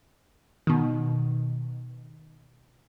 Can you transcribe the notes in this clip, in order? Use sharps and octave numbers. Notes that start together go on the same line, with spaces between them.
B2 D#3